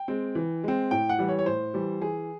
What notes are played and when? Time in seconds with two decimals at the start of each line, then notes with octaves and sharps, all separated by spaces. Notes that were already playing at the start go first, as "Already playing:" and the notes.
Already playing: G5
0.08 G#3 C4
0.35 E3
0.64 G#3 C4
0.91 A2 G5
1.09 F#5
1.19 E3 G3
1.28 C#5
1.39 C#5
1.46 A2 C5
1.74 E3 G3
2.01 E3 G#4